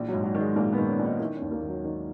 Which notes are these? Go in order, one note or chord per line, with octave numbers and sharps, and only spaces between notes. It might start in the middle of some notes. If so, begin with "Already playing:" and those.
Already playing: A#1 E3
F#3
G#2
F#3
D#3
G#3
A#1 A#3
B3
D#3
C#4
A#1
D#4
D#3 E4
C#4
D#2
A#3
D#2
F#3
D#3